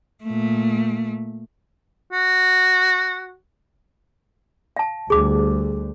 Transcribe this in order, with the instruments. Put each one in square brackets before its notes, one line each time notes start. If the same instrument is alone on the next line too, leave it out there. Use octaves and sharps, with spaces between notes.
[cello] A#2 A3
[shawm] F#4
[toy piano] F5 A5
[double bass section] D2 G3 [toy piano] G#4 D6